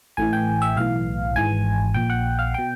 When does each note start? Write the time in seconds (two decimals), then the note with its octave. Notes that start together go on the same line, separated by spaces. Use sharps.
0.17 A1 A2 E3 G#5
0.33 G5
0.62 E5
0.77 B1 A2 E3 F5
1.36 G#1 G#2 E3 G#5
1.94 A#1 A#2 G5
2.10 F#5
2.39 F5
2.54 B2 G5